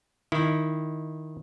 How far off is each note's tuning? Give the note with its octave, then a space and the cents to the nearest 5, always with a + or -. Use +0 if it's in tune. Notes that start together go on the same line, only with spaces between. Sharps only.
D#3 +0 E4 +0